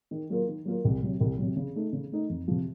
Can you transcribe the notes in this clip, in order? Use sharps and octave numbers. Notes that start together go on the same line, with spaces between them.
D#3
F#3 A#3 F4 A#4
D#3
F#3 A#3 F4 A#4
C2
C3 F#3
C2
C3 F#3
C#3
A3 D#4
C#3
A3 D#4
F2
C3 F3